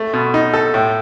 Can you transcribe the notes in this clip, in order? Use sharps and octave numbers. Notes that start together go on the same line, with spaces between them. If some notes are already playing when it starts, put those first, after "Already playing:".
Already playing: A3
B2
D#4
A4
A2